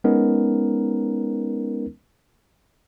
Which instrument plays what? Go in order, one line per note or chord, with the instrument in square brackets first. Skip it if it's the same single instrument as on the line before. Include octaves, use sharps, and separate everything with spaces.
[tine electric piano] G#3 B3 C#4 D#4 A#4